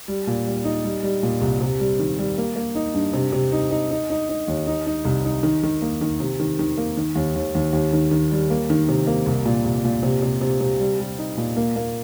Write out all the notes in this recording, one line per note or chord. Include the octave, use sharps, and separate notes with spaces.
G3
A#2
G3
D#4
G3
G3
A#2
C2
C3
G3
D#3
G3
A#3
A#3
D#4
G2
C3
C3
D#4
D#4
D#4
D#4
D#4
D#2
D#4
D#4
C2
D#4
D#3
D#3
A#3
D#3
C3
D#3
D#3
A#3
D#3
D#2
D#2
D#2
D#2
D#3
D#3
G3
A#3
D#3
C3
A#3
C2
A#2
C2
A#2
C3
C3
C3
C3
G3
G3
D#4
A#2
A#3
A#3